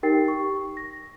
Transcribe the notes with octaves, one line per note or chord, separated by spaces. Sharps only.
D#4 G4 A#4 G5 A6 C7
C#6
A#6